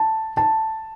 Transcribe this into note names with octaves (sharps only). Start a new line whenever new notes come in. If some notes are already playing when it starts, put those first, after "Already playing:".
Already playing: A5
A5